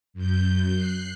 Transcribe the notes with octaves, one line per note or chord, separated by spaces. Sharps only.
F#2 G6
F#6 C7